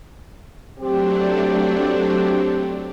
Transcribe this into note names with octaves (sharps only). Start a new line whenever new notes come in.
F#3 A3 C4 D4 G4